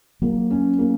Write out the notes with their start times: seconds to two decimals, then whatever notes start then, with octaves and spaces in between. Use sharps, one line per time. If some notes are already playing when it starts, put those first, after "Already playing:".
0.22 F#3 A#3
0.50 C#4
0.79 A#3